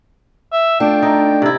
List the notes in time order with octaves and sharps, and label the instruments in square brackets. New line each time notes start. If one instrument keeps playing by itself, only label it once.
[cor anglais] E5
[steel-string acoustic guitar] A3 D4 F4 [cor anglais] G5
[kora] D#4
C3 E4